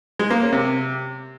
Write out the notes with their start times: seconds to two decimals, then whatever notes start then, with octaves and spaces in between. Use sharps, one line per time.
0.19 G#3
0.30 A#3
0.41 C#4
0.52 C3